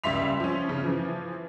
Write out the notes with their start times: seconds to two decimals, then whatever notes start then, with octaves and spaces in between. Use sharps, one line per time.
0.04 C#2 G3 E5 C6 B6 F7
0.40 F3 C#4
0.69 C#3
0.84 E3 F3